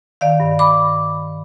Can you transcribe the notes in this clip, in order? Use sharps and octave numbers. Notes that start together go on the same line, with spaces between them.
D#3 D5 F5
G2
B5 D6